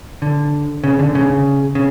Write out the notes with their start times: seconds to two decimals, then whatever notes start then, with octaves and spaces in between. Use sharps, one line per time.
0.22 D3
0.84 C#3
0.99 D3
1.15 C#3
1.75 C#3